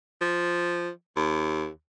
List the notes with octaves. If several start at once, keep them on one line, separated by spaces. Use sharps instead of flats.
F3
D#2